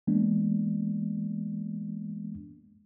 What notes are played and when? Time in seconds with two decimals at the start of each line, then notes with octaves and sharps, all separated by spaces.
0.07 E3 G#3 A#3 B3 D4